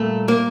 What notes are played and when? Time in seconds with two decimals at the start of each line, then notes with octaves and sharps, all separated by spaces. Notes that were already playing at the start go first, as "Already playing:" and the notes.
Already playing: A#2 G3 A3
0.28 A#3